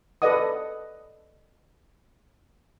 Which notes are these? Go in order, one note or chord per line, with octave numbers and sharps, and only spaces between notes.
A4 B4 D5 D#5 F#5 D#6